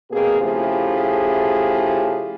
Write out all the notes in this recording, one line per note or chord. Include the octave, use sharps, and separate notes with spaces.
B2 A#3 C4 G#4
C#3 F3 A3 E4 G4 G#4